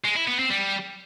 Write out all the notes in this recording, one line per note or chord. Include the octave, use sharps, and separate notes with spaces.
G#3
E4
B3
C4
G3